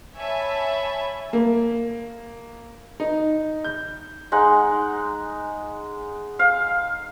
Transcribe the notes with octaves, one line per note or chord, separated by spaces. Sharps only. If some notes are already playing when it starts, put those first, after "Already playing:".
C#5 E5 G#5 A5 B5
A#3
D#4
G6
G#3 D#4 F#5
F5